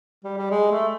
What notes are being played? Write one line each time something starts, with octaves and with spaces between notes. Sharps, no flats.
G3
G3
G#3
A3